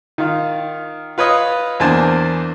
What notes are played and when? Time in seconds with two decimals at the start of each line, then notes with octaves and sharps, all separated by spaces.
0.18 D#3 F4
1.18 F4 B4 C#5 D#5
1.80 E2 A#3 D4 C5 G#5 A5